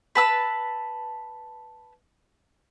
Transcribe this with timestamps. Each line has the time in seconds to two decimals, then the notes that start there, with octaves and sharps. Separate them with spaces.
0.15 B4 A5 E6